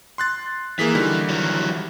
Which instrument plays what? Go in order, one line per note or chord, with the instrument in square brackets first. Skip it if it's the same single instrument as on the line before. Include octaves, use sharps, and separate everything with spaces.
[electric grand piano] C6 F#6 A6
[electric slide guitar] E3 [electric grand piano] A#3 G#4 B6
[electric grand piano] D3 D#3 G3
[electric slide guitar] E3 F#3